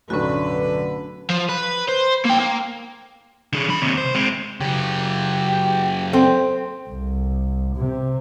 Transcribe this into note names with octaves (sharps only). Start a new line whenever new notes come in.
B1 F#2 A2 D3 C#4 F#4 B4
F3
B4
C5
A#3 G5
A#3
D3 G#4
F3 B5
D#2 C3
C5
G#3 C4
C#3 F#3 G4
C4 A4 G5
C2
C3